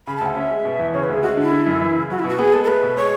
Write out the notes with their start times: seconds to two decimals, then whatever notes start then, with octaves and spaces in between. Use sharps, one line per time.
0.07 C#3 B5
0.17 A5
0.21 D2 F#5
0.35 C#4 E5
0.51 G#3
0.65 B2
0.80 E2
0.93 C#3 C#5
1.04 B4
1.09 D2 G#4
1.22 G#3 F#4
1.37 D3 E4
1.52 D3
1.66 F#2
1.81 E3
1.96 C#3
2.10 F#3 F#4
2.19 E4
2.24 B2 F#4
2.39 B3 G#4
2.53 G#3 A4
2.64 A4
2.68 A3 B4
2.83 B2
2.97 G#3 C#5